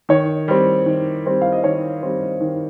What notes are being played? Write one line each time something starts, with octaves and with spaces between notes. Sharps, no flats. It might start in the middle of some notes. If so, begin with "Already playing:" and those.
D#3 C#5
G3 C4
D#3
G3 C4
F5
D#5
D#3 C#5
G3 C4
D#3